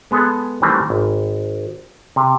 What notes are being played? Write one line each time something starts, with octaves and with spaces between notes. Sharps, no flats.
G#3 B3 G#4 A4
D#3 E3 G3 A3 C4
G#1
C3